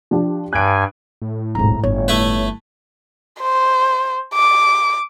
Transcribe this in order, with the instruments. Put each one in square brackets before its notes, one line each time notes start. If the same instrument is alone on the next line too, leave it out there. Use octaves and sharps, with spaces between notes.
[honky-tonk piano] F3 D4 G4
[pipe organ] G2 G#5 [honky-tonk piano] F#6 D7
[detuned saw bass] A2
[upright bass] D1 B1 [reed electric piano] G#2 A#5
[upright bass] G1 [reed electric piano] C#5
[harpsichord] A3 E4 B4
[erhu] C5
D6